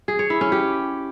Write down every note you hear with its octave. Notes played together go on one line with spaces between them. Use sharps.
G#4
C#5
E4
C#4
G4